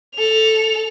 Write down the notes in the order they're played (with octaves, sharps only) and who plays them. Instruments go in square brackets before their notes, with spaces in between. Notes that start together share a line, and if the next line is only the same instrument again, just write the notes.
[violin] A4 F7